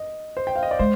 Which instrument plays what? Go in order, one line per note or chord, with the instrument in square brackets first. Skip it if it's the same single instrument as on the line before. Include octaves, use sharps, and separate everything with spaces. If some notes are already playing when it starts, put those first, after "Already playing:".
Already playing: [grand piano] D#5
C5
G5
F5
D#5
D5
[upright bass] G#3 [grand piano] C5